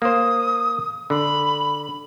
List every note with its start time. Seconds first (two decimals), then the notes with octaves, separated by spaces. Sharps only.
0.02 A#3 C5 D#6
1.10 D3 B5